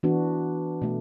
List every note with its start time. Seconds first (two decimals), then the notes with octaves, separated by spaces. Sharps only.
0.03 E3 B3 D4 F#4
0.82 B2 A3